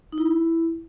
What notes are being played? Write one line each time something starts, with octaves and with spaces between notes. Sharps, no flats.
D#4
E4